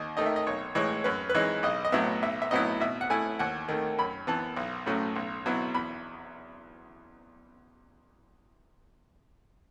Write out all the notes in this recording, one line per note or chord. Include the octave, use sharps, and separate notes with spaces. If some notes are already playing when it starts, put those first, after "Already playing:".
Already playing: D#2 D#5
D#3 A3 D#4 D#5
E5
D#5
B1 C#5
A2 E3 G#3 C#5
F#2 B4
B4
E3 G#3 D#4 C#5
B1 D#5
D#5
A2 F#3 B3 E5
B1 E5
E5
A2 F#3 B3 E4 D#5
B2 E5
F#5
A3 E4 G#5
D#2 F#5
D#3 A3
F#2 B5
E3 B3 A5
B1
A2 F#3 A3 C#4
B1
B2 F#3 B3 E4
E2 B5